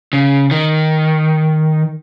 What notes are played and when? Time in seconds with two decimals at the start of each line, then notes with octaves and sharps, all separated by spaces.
0.13 C#3
0.51 D#3